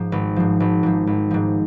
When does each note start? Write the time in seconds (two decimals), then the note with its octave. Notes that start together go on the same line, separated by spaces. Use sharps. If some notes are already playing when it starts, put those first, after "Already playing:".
Already playing: G#2 F3
0.12 G#1
0.36 G#2 F3
0.60 G#1
0.83 G#2 F3
1.07 G#1
1.31 G#2 F3